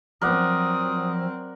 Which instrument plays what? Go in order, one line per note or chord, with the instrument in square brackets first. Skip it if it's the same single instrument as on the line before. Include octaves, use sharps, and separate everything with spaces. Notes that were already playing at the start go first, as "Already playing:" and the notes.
[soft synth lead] F3 [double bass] F#3 C4 [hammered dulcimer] A#4 D5 F#5 [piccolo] D#6